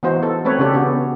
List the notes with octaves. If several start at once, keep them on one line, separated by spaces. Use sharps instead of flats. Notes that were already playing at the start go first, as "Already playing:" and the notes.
E3 B3 D#4 F#4 C5
A4
A3 C4 B4 C#5
C#3 C#4 D4 G4 A4
B3 F#4